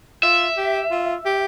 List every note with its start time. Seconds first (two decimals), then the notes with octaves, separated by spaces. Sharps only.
0.23 F4 E5
0.58 G4
0.91 F4
1.26 G4